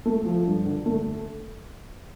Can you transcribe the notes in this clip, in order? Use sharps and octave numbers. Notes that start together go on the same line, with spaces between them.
A3
F3
G2
D3
A3